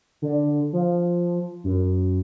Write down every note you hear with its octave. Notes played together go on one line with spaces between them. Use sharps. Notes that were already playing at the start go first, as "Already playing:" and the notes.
D3
F3
F#2